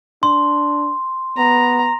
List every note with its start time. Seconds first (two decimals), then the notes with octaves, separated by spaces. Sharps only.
0.23 D4 C6
1.37 B3 A#5